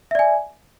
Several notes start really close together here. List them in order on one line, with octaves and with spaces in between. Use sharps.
E5 D5 G#5